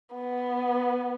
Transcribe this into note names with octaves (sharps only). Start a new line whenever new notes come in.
B3